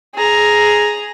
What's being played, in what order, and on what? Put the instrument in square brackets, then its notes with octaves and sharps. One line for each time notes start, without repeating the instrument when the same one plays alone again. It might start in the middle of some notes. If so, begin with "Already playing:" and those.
[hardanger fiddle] G#4 A#5